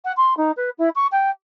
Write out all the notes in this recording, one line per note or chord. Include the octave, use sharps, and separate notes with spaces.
F#5
C6
D#4
B4
E4
C#6
G5